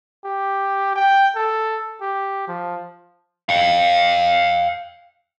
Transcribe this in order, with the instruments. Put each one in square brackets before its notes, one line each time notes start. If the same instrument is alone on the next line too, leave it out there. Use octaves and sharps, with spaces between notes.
[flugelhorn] G4
G5
A4
G4
F3
[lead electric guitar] F5 G5